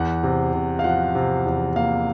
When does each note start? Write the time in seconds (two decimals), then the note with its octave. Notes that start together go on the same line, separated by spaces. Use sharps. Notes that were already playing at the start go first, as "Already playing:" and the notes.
Already playing: E2 F#5
0.23 C3
0.54 C3
0.79 F5
0.84 F3 F#5
1.15 C3
1.45 E2
1.76 A#3 F5